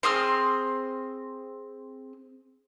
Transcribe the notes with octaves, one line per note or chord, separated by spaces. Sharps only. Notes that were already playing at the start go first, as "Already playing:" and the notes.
C4 G#4 C6 F6